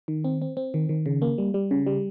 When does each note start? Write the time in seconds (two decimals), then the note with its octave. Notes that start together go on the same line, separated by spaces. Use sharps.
0.08 D#3
0.25 C4
0.42 C4
0.57 C4
0.74 D#3
0.89 D#3
1.06 C#3
1.22 A#3
1.38 G3
1.54 G3
1.71 C#3
1.86 G3